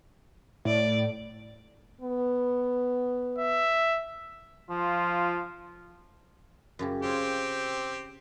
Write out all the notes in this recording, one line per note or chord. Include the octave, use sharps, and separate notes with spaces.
A2 D5
B3
E5
F3 F4
F#2 C#3 G4
C4 F4 G4 C#5